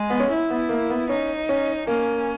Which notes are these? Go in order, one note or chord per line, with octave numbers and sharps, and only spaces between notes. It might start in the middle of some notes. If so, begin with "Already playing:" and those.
Already playing: G#3
B3
C#4
E4
B3
A#3
B3
C#4 D#4
C#4
A#3 C#4